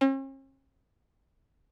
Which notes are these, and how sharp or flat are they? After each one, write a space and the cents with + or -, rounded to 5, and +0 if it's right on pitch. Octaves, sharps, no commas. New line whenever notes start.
C#4 -45